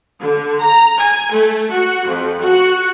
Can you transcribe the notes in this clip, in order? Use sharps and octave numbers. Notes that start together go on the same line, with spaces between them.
D3
A#5
G#5
A3
F#4
F2
F#4